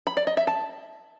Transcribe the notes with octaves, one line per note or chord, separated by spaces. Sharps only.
B5
D5
D#5
E5
A5